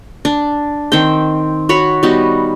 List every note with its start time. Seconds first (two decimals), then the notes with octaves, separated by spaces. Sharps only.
0.25 D4
0.92 D#3 C4 C5 G5
1.69 F#4 C#5 B5
2.03 G3 B3 D#4 F#4